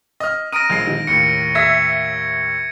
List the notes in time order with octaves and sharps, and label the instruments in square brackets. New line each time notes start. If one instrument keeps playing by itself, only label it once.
[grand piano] D#5 F6
[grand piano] A#5 D#6 F6 [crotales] A#6 D7 D#7
[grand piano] A#1 G#3 C7
[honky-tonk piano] D#3
[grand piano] D#2 A2 [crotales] C#7
[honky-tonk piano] E5 E6 B6 [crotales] G#6